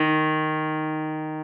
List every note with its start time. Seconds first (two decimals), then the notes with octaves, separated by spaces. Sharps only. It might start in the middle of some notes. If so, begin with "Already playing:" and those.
Already playing: D#3